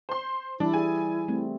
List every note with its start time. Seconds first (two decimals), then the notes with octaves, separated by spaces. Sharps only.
0.09 C5 C6
0.60 E3 G3 D4 E4 D5
0.73 G#4 G#5
1.28 G3 A3 C4